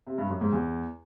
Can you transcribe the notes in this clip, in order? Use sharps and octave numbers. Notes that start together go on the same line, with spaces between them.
C3
G2
F#2
G#2
E2